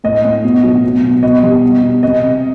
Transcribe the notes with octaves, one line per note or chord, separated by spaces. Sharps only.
A2 D#5
A2
B2
F#3
B2
B2
B2 D#5
G3
B2
B2
C3 D#5
C3